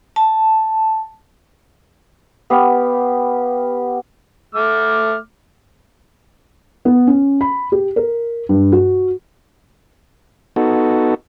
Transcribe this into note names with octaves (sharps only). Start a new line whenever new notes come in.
A5
B3 G4 F5
A3 D6 F6
B3
C#4
B5
G4
A#4
G2
F#4
B3 D#4 F#4 A4